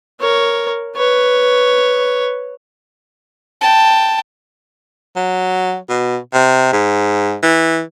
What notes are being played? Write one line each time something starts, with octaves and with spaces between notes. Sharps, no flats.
A#4 C#5
B4 C#5
G5 A5
F#3
B2
C3
G#2
E3